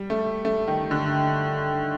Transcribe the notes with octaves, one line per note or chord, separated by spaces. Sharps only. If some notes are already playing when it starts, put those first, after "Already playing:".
Already playing: G3
A3
A3
D#3
D3